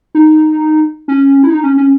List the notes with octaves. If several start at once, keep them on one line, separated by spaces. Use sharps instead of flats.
D#4
C#4
E4
D#4
C#4
C#4